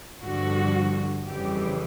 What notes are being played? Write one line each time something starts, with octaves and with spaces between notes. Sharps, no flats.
G2 D3 F3 F#4
F2 C#3 E3 G3 G4